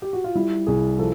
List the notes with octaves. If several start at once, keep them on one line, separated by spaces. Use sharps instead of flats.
G4
F#4
F4
G3 E4
C2 G#4
F3 A4